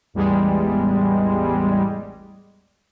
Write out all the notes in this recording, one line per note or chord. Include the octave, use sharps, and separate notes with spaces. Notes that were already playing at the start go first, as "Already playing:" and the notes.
A1 E2 G3 G#3